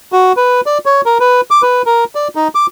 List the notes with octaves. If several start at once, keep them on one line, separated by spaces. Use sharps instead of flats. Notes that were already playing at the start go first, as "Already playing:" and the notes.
F#4
B4
D5
C#5
A#4
B4
D6
B4
A#4
D5
D#4
D6